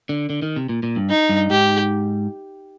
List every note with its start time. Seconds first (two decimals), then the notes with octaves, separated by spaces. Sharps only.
0.09 D3
0.30 D3
0.42 D#3
0.56 C3
0.69 A#2
0.83 A#2
0.96 G2
1.10 D#4
1.29 G2
1.50 G#2 G4